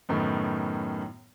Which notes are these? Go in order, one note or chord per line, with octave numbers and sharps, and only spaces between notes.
F#2 A2 D#3 B3